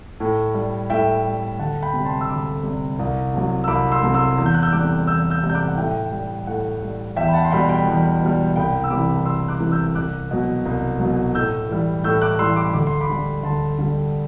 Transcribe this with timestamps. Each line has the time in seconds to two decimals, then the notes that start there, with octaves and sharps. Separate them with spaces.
0.20 A2
0.54 G3
0.90 A2 E5 G5
1.25 G3
1.59 D2 F#5 A5
1.82 G5 B5
1.93 C3
1.99 G3
2.05 A5 C6
2.21 E6
2.29 D2 B5 D6
2.63 C3 G3
2.99 C2
3.34 C3 F#3
3.64 E6
3.68 C2 B5 D6
3.92 C6 E6
4.03 C3 F#3
4.14 C6 E6
4.38 E2
4.46 G6
4.54 F#6
4.63 E6 G6
4.72 C3 G3 D6 F#6
5.07 E2 E6 G6
5.30 E6 G6
5.43 C3 G3
5.49 G6
5.55 D6 F#6
5.68 F#5
5.77 A2 E5 G5
6.12 G3
6.47 A2 F#5
6.82 G3
7.16 E2 E5 G5
7.28 B5
7.33 F#5 A5
7.45 C6
7.51 B2 G3 G5 B5
7.69 G5 B5
7.87 E2
8.21 B2 G3
8.56 C2 G5 B5
8.84 E6
8.90 C3 E3 G3 B5 D6
9.25 C2 C6 E6
9.48 D6 F#6
9.60 C3 E3 G3
9.72 E6 G6
9.95 C2 D6 F#6
10.31 B2 F#3
10.65 C2
10.99 B2 F#3
11.35 A2 E6 G6
11.69 E3 G3
12.04 A2 E6 G6
12.22 D6 F#6
12.39 E3 G3 C6 E6
12.56 B5 D6
12.73 D2 D6
12.87 C6
13.01 B5 D6
13.10 D3 G3
13.43 D2 A5 C6
13.78 D3 G3